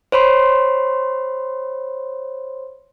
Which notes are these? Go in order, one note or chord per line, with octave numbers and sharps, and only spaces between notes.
C5 C#5 B5 C6